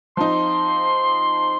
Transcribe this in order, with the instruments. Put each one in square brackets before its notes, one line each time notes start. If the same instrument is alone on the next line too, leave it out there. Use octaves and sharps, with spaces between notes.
[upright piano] F3 C4 D#4 [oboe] C6